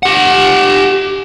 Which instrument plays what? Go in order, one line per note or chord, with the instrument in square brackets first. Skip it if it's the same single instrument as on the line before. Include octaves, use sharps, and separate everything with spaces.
[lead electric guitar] G4 F#5